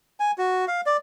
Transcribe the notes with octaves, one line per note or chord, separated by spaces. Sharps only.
G#5
F#4
F5
D5